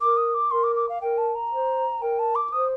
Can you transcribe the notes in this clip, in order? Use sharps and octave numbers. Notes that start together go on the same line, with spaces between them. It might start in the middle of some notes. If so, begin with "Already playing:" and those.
A#4 D6
D#6
D6
A#4 C6
D6
D6
F5
A#4 G5
A5
A#5
C5
A#4 G5
A5
D6
C5 D#6